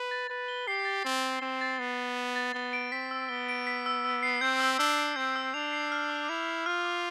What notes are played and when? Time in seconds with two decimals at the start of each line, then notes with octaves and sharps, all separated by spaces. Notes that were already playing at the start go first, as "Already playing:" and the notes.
Already playing: B4
0.11 A6
0.29 B4 A6
0.48 G7
0.67 G4 C7
0.85 A6
1.05 C4 A6
1.23 G7
1.42 C4 E7
1.61 A6
1.79 B3 A6
1.98 G7
2.17 E7
2.36 A6
2.54 B3 G7
2.73 D7
2.92 C4 B6
3.11 E6
3.29 B3 G7
3.49 D7
3.67 B6
3.86 E6
4.05 E6
4.23 C7
4.41 C4 G6
4.60 E6
4.79 D4 E6
4.98 C7
5.16 C4 G6
5.36 E6
5.54 D4 F7
5.73 C7
5.92 F6
6.10 D6
6.28 E4 F7
6.48 C7
6.66 F4 F6
6.85 D6